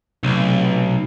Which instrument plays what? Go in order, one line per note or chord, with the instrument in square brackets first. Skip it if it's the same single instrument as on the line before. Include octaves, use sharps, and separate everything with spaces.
[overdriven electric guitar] B1 [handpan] C3 A3